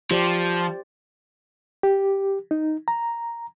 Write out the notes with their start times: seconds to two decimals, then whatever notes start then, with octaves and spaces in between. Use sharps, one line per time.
0.11 F3 G4 C5 D5
1.83 G4
2.51 D#4
2.88 A#5